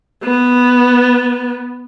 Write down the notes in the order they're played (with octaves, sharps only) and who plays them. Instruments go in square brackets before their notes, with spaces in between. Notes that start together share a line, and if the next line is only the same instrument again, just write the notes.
[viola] B3